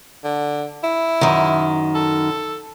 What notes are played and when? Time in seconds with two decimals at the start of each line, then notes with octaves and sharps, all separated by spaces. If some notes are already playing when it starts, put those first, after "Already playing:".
0.24 D3
0.83 E4
1.21 F#2 D#3
1.95 A4